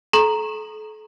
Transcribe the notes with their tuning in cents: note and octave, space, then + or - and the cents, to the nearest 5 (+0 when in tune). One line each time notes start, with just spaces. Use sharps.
A4 -35 A#5 +0 C#6 -35